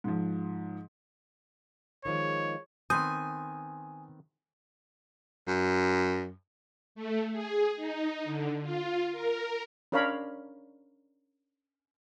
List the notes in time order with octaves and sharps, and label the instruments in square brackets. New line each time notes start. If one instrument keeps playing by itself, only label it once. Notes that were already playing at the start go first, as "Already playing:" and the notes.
[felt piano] G#2 F3
[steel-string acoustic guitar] D#3 F3 G#3 [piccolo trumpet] C#5
[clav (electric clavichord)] D#3 B3 C4 [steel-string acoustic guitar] G#5 [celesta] C6 G6 [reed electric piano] D#6
[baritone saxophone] F#2
[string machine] A3
G#4
D#4
D3
F4
A#4
[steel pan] C#4 D4 A#4 C#5 F5 B5